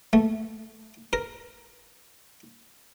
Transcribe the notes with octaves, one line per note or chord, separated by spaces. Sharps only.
A3
A#4